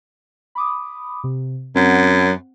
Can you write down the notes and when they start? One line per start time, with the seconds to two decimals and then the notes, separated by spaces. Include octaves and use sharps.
0.55 B5 D6 D#6
1.24 C3
1.75 F#2 C4 F#5